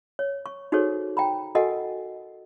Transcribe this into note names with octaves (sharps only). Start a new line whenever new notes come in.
C#5
C#6
D#4 F#4 G#4 A4 C5 C#5
G5 A#5 B5
F#4 A4 A#4 D#5 F#5 G#5